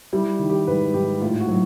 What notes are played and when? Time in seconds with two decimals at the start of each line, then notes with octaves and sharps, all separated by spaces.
0.13 G3 E4
0.39 D#3
0.50 G4
0.67 G#2 B4
0.94 G#2 G4
1.21 A2 F4
1.40 F#4
1.49 F#3